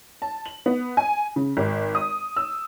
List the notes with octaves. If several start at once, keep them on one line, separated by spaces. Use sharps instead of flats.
A5
F#7
B3
G#5
C#3
G#1
D#6
E6